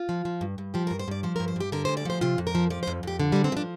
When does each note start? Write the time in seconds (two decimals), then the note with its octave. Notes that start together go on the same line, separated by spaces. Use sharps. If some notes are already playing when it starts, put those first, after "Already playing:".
Already playing: F4
0.09 F3
0.25 F3
0.41 G2
0.58 G2
0.74 F3 G4
0.87 A#4
0.91 G2
0.99 C5
1.08 G2 D5
1.23 F3 C5
1.36 A#4
1.40 G2
1.48 C5
1.56 G2 G4
1.72 D3 A#4
1.85 D2 C5
1.97 D5
2.05 F3 C5
2.21 C3 F4
2.38 F2
2.47 A#4
2.55 F3
2.70 F3 D5
2.83 C5
2.87 F2
3.03 F2 G4
3.20 D3
3.32 G2 G3
3.44 C4
3.52 F3 D4